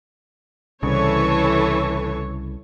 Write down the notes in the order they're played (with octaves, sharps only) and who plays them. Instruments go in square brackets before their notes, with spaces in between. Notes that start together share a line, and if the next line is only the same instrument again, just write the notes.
[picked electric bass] C2 C#3 [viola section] E3 A4 C#5